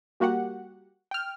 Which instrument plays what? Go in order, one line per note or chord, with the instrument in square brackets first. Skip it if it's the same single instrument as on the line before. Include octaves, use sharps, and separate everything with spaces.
[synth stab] G3 A#3 F#4 G4 F#5
G5 F6